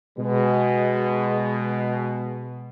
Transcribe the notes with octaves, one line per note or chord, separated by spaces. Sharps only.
B2 G#3